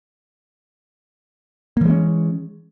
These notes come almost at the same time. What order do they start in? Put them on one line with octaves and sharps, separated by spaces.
A#3 E3 G#3 C#4